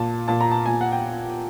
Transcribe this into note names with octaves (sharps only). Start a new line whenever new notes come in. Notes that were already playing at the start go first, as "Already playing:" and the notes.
Already playing: A#2 A5
A#2 A5
A#5
A5
A#2 G#5
F#5
G5